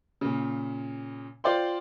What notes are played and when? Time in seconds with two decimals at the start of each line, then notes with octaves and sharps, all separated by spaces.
0.21 A#2 C#3
1.44 F4 C5 D5 G5 C6